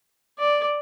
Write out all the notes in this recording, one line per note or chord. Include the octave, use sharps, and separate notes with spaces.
D5